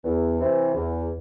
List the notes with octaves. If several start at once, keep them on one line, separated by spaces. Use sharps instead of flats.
E2
C3 E3
E2